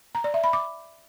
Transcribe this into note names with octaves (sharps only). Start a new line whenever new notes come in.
A#5
D5
E5
B5
D6